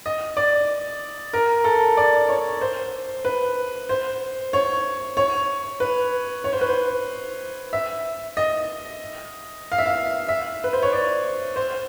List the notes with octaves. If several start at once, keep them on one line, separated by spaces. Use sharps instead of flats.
D#5
D5
A#4
A4
D5
C#5
C5
B4
C5
C#5
C#5
B4
C#5
C5
B4
C5
E5
D#5
F5
E5
F5
E5
B4
C5
C#5
D5
C5